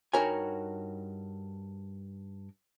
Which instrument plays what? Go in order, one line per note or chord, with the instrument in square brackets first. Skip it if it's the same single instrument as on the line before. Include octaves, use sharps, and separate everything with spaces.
[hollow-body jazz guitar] G2 D#4 F#4 A#4 C#5 G#5